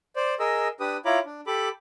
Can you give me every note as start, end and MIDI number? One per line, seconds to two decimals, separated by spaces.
0.16 0.34 72
0.16 0.34 74
0.40 0.68 68
0.40 0.68 70
0.40 0.68 75
0.40 0.68 88
0.80 0.97 62
0.80 0.97 67
0.80 0.97 71
0.80 0.97 87
1.05 1.19 64
1.05 1.19 65
1.05 1.19 73
1.05 1.19 82
1.05 1.19 83
1.05 1.19 86
1.26 1.41 62
1.47 1.69 67
1.47 1.69 69
1.47 1.69 83
1.47 1.69 86